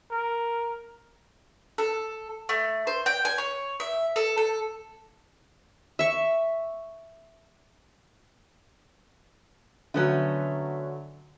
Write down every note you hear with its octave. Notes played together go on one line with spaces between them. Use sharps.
A#4
A4
A3
C5
G5
G#5
C#5
E5
A4
A4
E5 C#6
D3 F#3 A3 B3 C#4